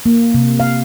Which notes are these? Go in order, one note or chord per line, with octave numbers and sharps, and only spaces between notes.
A#3
C3
F5